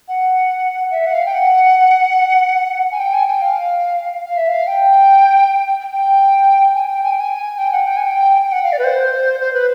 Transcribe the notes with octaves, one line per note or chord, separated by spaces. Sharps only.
F#5
E5
F#5
F5
G5
F#5
G#5
G5
G#5
G5
F5
F5
E5
F5
G5
G5
G#5
G5
G#5
G5
G#5
G5
F#5
G5
G#5
G5
G5
F#5
F5
D5
B4
C5
C5
B4